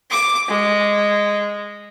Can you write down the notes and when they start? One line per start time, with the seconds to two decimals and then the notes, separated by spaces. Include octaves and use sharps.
0.10 D6
0.49 G#3